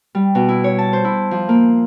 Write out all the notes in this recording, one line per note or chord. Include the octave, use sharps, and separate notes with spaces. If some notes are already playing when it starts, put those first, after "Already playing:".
G3
B2
E4
C#5
A5
C5
E4
F3
A#3